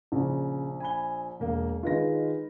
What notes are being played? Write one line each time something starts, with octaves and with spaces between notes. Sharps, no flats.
A#1 C#3
G#5 B5 G7
E1 A#3 F5
D#3 G#3 D#4 F4 B4 A#6